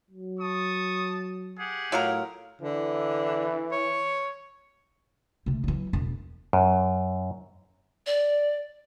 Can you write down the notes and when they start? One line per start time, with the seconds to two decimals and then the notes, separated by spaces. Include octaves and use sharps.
0.10 F#3
0.40 A5 C#6 D#6
1.59 G4 G#4 F#5
1.92 A2 F#3 F4 A#4
2.62 D3 E3
3.72 C#5
5.46 C3 A3
5.64 E3 F#3
5.93 E1 D4
6.53 F#2
8.06 D5